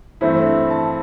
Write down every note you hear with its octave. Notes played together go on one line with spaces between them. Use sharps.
G2 E3 A3 C4 E4
A5